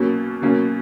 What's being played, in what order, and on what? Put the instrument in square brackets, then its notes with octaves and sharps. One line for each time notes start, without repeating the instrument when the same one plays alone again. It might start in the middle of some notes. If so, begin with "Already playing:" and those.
Already playing: [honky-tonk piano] B2 F#3 A#3 C#4
B2 F#3 A#3 C#4